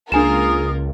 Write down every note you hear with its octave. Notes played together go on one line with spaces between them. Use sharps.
C#2 A#3 D4 F4 G#4 A#4 G#5 E7